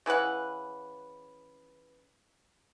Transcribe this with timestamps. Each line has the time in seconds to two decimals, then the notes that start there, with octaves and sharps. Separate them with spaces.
0.06 C#3 E3 B4 F#5